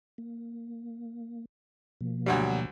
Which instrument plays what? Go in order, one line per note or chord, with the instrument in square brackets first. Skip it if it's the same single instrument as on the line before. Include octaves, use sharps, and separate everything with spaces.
[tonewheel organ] A#3
B2 F3 A#3
[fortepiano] D2 F#3 G3